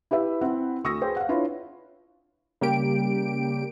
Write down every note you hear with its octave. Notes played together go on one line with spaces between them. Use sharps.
E4 G4 B4 E5
C4 E4 F#5
D2 C#6 D#6 E6 A#6
G#4 B4 C5 G5
F5 F#5
D4 E4 F4 B4 C#5
C#3 G3 A#3 G4 D7